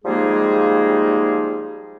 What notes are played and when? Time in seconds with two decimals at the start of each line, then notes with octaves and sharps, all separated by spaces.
0.05 F3 G3 G#3 A#3 D#4 G#4